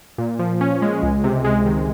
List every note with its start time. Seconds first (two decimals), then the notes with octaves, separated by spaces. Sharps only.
0.18 A#2
0.39 F3
0.61 C#4
0.82 G#3
1.03 C#2
1.24 C3
1.44 G#3
1.66 D#3